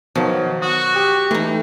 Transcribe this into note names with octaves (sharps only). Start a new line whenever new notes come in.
B2 D#3 F3 F#3
F#4 D#6
G4
E3 A3 D#4